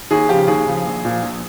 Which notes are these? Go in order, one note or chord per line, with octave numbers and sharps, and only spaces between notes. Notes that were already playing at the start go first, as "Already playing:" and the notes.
D#2 G#4
C#3 F3 G4
D#2 G#4
C#3 F3
A#1
A#2 F3
A#1